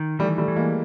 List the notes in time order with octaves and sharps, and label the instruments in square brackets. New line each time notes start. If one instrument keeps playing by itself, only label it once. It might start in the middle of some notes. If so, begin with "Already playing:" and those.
Already playing: [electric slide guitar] D#3
[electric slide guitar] E3 [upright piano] G3 A3
[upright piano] G3 A3
[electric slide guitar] E3
[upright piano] G#3 A#3